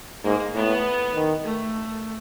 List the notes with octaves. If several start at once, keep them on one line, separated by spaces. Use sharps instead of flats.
G#2 A#3
A2 B3
D#3
A3